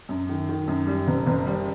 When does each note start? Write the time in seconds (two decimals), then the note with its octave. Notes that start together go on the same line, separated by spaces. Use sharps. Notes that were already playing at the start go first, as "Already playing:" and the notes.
0.09 F#2
0.29 D#3
0.49 D#3
0.68 F#2
0.87 G3
1.08 F#1
1.27 F#1
1.46 G3